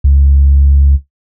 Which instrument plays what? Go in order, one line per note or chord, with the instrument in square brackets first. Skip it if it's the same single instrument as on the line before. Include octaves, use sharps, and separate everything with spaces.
[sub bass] C#2